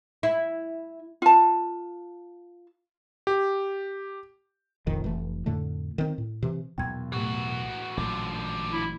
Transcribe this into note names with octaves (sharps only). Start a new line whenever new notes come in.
E4
F4 A5
G4
F1 A#1 F2 D#3
F1 E3 A3
F2 A2 D3 A3
D#3 C4
A2
C3 E3
B1 E2 A#2 G5 G#6
A2 E3 A3 F#4
A1 A#2 D3 F3 F#3
E4